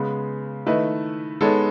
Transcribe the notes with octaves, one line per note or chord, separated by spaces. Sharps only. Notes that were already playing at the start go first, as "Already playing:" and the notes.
Already playing: C#3 G#3 B3
D#3 A3 E4 B4 D#5
G#3 B3 D#4 A4 C#5